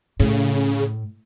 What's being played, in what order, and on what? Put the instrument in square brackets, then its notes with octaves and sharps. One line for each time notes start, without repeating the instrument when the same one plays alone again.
[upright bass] A2 [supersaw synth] C#3